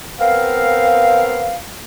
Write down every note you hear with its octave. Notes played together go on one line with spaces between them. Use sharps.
B3 C4 A#4 F5